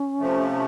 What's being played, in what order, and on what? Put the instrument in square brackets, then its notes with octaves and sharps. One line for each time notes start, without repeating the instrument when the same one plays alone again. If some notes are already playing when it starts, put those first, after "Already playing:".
Already playing: [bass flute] C#4
[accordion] C3 F3 A3